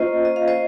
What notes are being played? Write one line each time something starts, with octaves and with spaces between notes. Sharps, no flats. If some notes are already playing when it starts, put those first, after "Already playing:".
Already playing: A#3 C#4 F4 C5 D#5
D#5
F5
C5 D#5